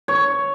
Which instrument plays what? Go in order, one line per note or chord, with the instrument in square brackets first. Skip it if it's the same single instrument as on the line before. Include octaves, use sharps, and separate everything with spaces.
[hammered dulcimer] C#5